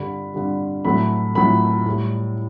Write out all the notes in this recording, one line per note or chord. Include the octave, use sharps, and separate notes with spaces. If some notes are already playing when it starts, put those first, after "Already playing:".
Already playing: G2 D3 G3 B5
G2 D3 G3
A2 F#3 A3 B5
A2 F#3 A3 B5
A2 G3